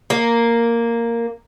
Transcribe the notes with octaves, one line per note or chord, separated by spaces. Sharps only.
A#3